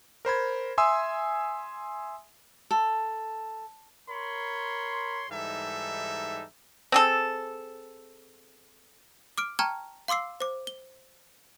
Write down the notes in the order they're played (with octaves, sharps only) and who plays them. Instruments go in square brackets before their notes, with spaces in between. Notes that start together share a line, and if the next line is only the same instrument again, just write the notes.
[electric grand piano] A#4 C5 B5 G#6
E5 G#5 C6 D#6 E6
[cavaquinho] A4
[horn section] A#4 C#5 B5 C6
G#2 E3 G3 D#4 A4 E5
[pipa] C4 G#4 A4
[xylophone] D6 F6 D7
G5 A5 A#5 C#6 F6 G#6
F5 C6 D6 E6 C7
C5 D6
G7